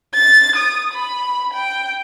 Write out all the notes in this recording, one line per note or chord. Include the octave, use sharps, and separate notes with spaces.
A6
D#6
B5
G5